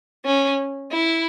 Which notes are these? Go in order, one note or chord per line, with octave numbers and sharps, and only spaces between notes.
C#4
E4